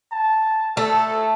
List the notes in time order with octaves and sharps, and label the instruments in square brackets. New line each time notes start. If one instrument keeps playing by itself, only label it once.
[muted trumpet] A5
[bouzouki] A3 [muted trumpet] A4